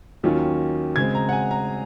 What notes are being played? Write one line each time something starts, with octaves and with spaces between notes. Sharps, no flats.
D#2 D#3 F#3 C#4 F4
C#3 G#3 C4 G#6
A#5
F#5
G#5
A#5